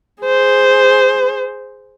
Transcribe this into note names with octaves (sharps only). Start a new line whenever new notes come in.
G#4 C5